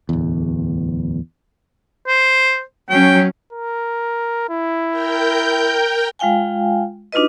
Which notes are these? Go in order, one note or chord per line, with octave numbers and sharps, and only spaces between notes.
D1 E2
C5
F#3 C#4 G5
A#4
E4
A#4 G5 G6
G#3 F4 F5 G5 G#5
D4 D#4 F4 F#4 B4 D#5